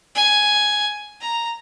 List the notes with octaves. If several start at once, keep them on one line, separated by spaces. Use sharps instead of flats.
G#5
A#5